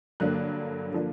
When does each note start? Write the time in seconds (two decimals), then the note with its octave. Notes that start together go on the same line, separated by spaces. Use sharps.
0.20 G2 D3 F#3 A#3 D4 F#6
0.92 D3 F3 A#3 D4